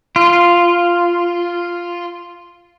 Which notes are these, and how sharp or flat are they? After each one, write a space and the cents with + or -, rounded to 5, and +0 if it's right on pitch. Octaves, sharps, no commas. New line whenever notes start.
F4 -5